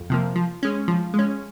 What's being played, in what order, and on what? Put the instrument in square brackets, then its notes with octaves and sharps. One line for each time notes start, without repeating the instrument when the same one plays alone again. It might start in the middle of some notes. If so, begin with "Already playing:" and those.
Already playing: [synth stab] F2
C3 F3 A#3
F3
G#3 C#4
F3
G#3 C#4